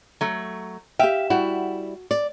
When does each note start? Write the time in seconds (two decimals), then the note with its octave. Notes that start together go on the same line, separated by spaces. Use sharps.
0.21 F#3 A3
0.99 G4 E5 F5 G5
1.30 G3 E4 F#4 F#5
2.11 D5